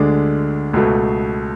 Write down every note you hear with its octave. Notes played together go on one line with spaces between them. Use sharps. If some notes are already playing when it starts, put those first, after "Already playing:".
Already playing: D2 D3 G#3 D5
C#2 B2 A3